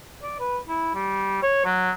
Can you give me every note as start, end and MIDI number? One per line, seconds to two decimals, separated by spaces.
0.23 0.38 74
0.40 0.58 71
0.68 0.92 64
0.95 1.41 55
1.43 1.62 73
1.65 1.91 54